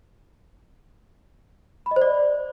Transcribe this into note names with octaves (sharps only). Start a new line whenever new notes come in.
B5
D#5
C5
D5